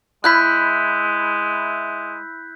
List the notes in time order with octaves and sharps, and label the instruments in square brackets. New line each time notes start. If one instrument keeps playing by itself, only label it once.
[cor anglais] G#3 [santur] E4 B5 [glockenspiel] F#6 G6 B6